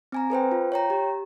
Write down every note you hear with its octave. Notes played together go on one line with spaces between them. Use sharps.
C4 G#5 A#5
A4 B4 C5 G5
F4
C#5 G5 A#5
G4